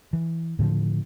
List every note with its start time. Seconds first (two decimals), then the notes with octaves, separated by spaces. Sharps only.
0.13 E3
0.59 A2 D3 D#3 F3